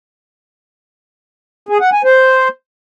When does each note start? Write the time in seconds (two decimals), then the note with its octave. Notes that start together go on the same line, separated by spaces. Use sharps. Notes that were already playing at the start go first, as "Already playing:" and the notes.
1.69 G#4
1.81 F#5
1.93 G#5
2.04 C5